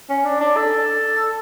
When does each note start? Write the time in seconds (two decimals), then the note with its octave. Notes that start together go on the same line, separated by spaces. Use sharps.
0.09 C#4
0.25 D4
0.40 D4
0.56 A4